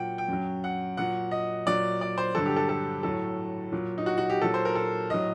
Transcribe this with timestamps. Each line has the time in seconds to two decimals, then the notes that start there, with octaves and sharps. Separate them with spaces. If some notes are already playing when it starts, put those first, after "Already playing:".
Already playing: A#2 F#3 F#5 G5
0.18 G5
0.28 F#2 F#3
0.64 F#5
0.97 A#2 F#3 F#5
1.31 D#5
1.66 A#2 F#3 D5
2.01 D5
2.18 C5
2.35 G2 D3 F#3 A4
2.46 G4
2.57 A4
2.69 A4
3.03 A2 F#3 A4
3.72 A#2 F#3
3.98 D#4
4.06 F#4
4.18 F#4
4.30 G4
4.41 A#2 F#3 A4
4.54 C5
4.65 A#4
4.75 A4
5.10 A2 F#3 D#5